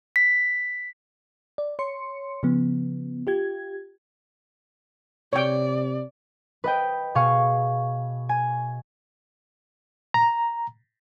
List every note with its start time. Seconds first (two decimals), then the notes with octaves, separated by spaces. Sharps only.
0.16 B6
1.58 D5
1.79 C#5 C6 C#7
2.43 C#3 F3 B3
3.27 F4 G4 G#6
5.33 C3 C#5 D5 G5
6.64 B4 D#5 G5
7.15 B2 G#4 F5 C#6
8.29 G#5
10.14 A#5